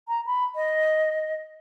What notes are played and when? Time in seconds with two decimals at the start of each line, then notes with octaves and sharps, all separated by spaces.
0.08 A#5
0.26 B5
0.56 D#5